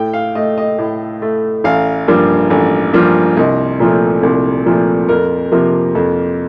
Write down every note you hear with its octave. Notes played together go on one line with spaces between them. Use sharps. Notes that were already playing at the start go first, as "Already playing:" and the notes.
Already playing: A2 G5
F5
A3 D#5
D#5
A2
A3
A1 F5
G2 F3 A#3
A1
G2 F3 A#3
C2 D#5
A#2 F3 A3
C2
A#2 F3 A3
F2 A#4
C3 F3 A#3
F2